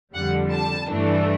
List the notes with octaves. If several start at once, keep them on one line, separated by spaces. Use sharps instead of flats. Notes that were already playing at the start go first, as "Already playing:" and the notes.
F2 D3 G3 F#5
A5
G2 E3 A3 D4